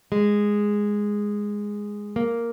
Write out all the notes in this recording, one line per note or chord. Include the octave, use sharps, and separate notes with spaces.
G#3
A#3